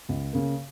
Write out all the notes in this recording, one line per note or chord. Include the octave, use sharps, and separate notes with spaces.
C#2
C#3 A#3